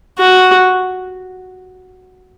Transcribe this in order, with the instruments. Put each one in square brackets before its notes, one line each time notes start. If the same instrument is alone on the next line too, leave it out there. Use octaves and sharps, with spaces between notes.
[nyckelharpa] F#4